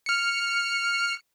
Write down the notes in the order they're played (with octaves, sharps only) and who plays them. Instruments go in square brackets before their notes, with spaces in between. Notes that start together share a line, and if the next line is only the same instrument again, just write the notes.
[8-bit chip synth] F6 C#7